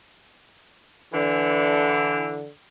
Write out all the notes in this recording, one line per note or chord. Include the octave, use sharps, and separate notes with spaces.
D3 E3